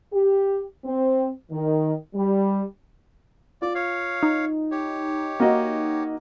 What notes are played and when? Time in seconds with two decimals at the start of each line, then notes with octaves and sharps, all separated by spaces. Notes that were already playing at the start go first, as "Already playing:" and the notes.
0.13 G4
0.84 C4
1.51 D#3
2.14 G3
3.62 F4 D5
3.75 C#5 F5
4.23 D#4
4.71 G4 C#5
5.40 A#3 F#4 D#5